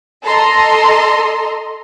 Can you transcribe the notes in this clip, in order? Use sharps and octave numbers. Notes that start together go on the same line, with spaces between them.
A4 D#5 A#5 C6